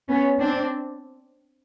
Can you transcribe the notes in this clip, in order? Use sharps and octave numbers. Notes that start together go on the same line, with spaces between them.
B3 C#4
C4 D4